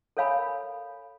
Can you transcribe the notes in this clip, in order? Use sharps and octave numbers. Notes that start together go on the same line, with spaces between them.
A4 A#4 C#5 F5 G#5 B5